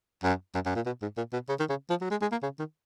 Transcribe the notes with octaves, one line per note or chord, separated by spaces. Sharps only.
F#2
F#2
F#2
A#2
B2
G#2
A#2
B2
C#3
D#3
C#3
F3
F#3
G#3
G#3
A#3
C#3
D#3